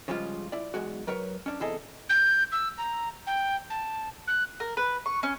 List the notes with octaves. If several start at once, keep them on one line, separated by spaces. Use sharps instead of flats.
C#3 F3 G3 G#3 F4
E4 D5
B1 E2 G#3 F#4
F#3 A#4 B4 C#5
C#4 D4
E2 C3 E4 G#4 A4 D#5
G6
E6
A#5
G5
A5
F#6
A#4
B4
C#6
C#4